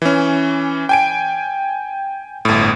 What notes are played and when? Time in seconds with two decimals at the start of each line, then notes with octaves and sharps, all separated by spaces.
0.02 E3 C#4
0.89 G5 G#5 D7
2.45 G1 A2